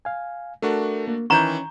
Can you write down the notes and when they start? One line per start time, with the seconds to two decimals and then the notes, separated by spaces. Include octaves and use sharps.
0.05 F5 G#5
0.62 A3 D4 F#4 A4 A#4
1.08 A#3
1.30 D#3 E3 C#4 A#5 C#6 G6